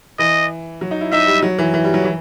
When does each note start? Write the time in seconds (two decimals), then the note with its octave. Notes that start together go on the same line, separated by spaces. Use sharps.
0.19 E3 D#5
0.81 F#3
0.91 D#4
1.01 E4
1.12 D#4 E5
1.27 G3
1.42 F#3
1.58 E3
1.74 E3
1.84 G3
1.94 F#3
2.04 E3